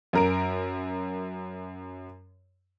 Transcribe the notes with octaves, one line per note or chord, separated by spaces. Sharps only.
F#2 A#4 D7